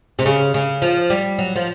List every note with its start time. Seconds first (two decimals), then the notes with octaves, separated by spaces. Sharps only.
0.19 C3
0.26 C#3
0.54 C#3
0.82 F3
1.10 G3
1.39 F#3
1.56 F3